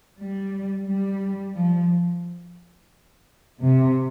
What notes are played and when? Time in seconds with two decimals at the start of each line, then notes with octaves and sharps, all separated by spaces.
0.18 G3
0.87 G3
1.55 F3
3.62 C3